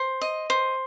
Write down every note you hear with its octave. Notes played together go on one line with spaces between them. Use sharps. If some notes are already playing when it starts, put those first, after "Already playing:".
Already playing: C5
D#5
C5